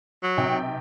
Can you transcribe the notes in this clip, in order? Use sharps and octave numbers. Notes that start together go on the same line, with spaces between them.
F#3
B1 C3 G5